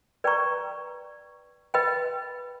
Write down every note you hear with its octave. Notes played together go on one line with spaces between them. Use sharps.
B4 D5 G5 A#5 C#6
B4 D#5 G5 B5